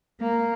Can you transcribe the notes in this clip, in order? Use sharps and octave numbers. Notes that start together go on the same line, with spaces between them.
A#3